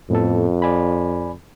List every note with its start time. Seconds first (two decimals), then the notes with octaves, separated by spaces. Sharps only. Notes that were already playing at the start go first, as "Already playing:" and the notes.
0.11 F2 A2 B3 A4
0.62 D5 G#5 B5